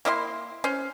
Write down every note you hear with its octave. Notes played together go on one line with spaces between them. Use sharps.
A#3 E4 D#5 C6
C#4 C5